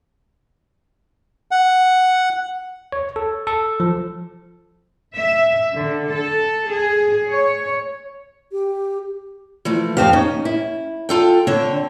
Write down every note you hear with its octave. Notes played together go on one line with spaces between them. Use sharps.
F#5
C#5
A4
A4
F3
E5
D3
A4
G#4
C#5
G4
E3 F3 A3
F2 C4 G4 F5
C#4 D#4
E4
F4 A4 G5
D3 C4 D4 C#5